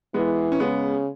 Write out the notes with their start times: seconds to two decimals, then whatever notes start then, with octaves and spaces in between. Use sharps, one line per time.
0.14 E3 G#3 B3
0.52 C#4
0.60 C#3 G#3 B3